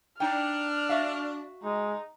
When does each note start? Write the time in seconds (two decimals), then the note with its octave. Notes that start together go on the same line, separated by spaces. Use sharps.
0.20 D4 D#4 G5 F6
0.89 F#4 E5 F5
1.64 G#3 D#4